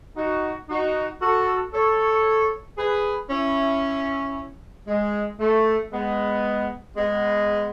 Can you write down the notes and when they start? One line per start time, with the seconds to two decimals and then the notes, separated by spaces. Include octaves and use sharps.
0.16 D#4 F#4
0.69 D#4 F#4
1.21 F#4 A4
1.73 A4 C#5
2.77 G#4 B4
3.30 C#4 E4
4.87 G#3
5.39 A3
5.92 G#3 B3
6.97 G#3 B3